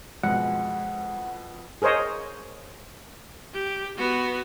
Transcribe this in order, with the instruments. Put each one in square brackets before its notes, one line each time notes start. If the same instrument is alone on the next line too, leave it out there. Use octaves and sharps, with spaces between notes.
[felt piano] F2 B2 [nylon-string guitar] G#3 [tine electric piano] F#5
[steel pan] G#4 A#4 C5 C#5 D#5
[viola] G4
B3 F#4